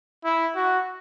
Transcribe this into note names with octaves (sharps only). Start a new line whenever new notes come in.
E4
F#4